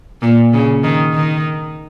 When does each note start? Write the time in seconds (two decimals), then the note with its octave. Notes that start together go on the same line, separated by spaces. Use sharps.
0.22 A#2
0.53 C#3
0.83 D#3
1.14 D#3